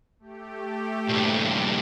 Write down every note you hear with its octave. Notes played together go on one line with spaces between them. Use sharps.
A3 G4
G2 A#2